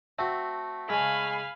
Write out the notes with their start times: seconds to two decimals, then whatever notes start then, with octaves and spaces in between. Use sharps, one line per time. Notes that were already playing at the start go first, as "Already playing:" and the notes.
0.19 A3 C4 F#4
0.90 C#3 G#3 F5 G#5 B5